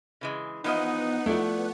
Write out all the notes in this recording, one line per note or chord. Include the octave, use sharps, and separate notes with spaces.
C#3 E3 G#3
E3 F3 B3 D#4 D#5 F#5
F3 A3 E4 D5